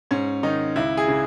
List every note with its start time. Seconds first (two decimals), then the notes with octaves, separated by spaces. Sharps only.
0.11 G#2 C#4
0.43 D#3 D#4
0.76 C#2 E4
0.97 G#4
1.08 C#3